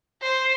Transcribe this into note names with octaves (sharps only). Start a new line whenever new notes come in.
C5